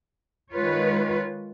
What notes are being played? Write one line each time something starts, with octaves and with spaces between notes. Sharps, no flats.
D#3 G#3 F4 B4 C#5